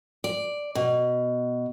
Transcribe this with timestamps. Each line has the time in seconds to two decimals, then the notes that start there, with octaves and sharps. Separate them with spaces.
0.24 D5
0.75 B2